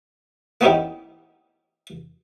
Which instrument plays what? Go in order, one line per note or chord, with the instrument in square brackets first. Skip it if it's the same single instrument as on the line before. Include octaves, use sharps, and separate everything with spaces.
[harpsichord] A#3 B3 C#4 D#4 E4 G4